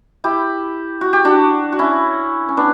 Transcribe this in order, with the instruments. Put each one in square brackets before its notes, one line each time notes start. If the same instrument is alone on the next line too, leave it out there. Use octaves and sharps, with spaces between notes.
[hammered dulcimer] E4 G4
F#4
G4
D4 F#4
F#4
C#4 E4
C#4
B3 D4